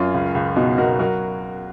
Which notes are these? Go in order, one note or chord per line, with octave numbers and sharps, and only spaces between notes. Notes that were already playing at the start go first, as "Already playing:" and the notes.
Already playing: F#2 C#4 F4
C#2
C#2
B2 D#4 F#4
B2 F#4 A#4
F#3 F#4 A#4